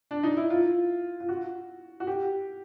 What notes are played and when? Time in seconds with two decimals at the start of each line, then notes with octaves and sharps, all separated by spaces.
0.11 D4
0.23 D#4
0.37 E4
0.50 F4
1.20 F4
1.29 F#4
2.00 F#4
2.07 G4